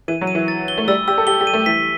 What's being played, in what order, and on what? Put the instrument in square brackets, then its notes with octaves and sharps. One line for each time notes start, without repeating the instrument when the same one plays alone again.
[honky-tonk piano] E3 [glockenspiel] D#7
[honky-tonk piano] F#3
[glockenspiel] D#7
[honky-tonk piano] E3
[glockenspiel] A6
G7
[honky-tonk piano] A3
[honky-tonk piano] G3 [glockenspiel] E6
[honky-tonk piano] G4 [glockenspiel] E6
[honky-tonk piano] A4
[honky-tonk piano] G4 [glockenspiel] G7
[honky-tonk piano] G4
[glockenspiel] D#7
[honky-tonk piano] A3
[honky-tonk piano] E3 [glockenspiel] B6